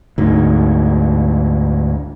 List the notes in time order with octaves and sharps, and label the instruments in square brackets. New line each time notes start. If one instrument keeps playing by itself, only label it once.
[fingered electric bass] D2 G#2